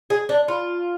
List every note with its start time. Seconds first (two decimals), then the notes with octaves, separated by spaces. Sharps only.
0.10 G#4
0.29 D4
0.48 F4